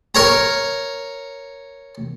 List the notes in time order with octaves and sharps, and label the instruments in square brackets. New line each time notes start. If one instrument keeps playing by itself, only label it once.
[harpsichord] A#4 C#5 A#5